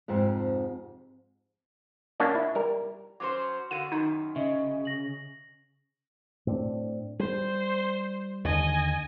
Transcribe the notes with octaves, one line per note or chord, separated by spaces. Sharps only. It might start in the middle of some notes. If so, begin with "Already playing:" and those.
F2 G#2 C3 C4
F#3 A#3 C#4 D4 F#4
E4
G3 A#4
F#3 C#4 C5 D6
D3 A#3 F#4 D#7
F#2 D#3 D#4
C#3 D#5 E5
A#6 F#7
A2 C4 D4
G3 C5
D#2 D3 D#5 G#5